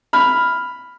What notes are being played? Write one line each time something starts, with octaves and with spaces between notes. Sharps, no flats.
B5 F6